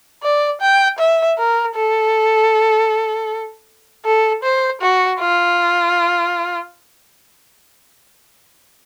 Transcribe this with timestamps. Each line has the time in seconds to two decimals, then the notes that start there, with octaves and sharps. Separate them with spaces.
0.23 D5
0.61 G5
0.99 E5
1.38 A#4
1.76 A4
4.05 A4
4.43 C5
4.82 F#4
5.20 F4